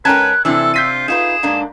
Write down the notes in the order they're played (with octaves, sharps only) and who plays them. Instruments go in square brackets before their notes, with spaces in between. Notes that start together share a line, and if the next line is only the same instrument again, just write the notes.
[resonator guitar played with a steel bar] G#2 C#4 A5 [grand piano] A#4 G5 G#6 [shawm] B4 [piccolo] F#6
[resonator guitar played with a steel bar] C3 C4 D4 [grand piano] E3 [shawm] A4 [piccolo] E6
[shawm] F4 [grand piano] G6 B6 D#7
[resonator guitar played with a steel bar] D#4 F4 B4 [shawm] G#4 [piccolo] E7
[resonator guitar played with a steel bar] G#2 A#3 D4